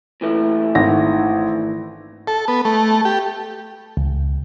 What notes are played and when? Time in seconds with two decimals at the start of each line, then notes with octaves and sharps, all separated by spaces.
0.21 A#2 E3 A3
0.75 G#1 A#6
2.27 A4
2.48 B3
2.65 A3
3.05 G4
3.97 C#2